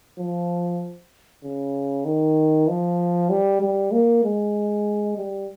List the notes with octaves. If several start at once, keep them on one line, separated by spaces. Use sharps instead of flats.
F3
C#3
D#3
F3
G3
G3
A#3
G#3
G3